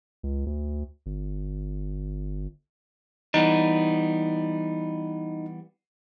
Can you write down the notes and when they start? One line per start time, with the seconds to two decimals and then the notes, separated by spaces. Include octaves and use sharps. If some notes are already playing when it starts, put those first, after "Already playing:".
0.23 C#2
0.46 D2
1.06 G1
3.34 E3 G3 B3 D#4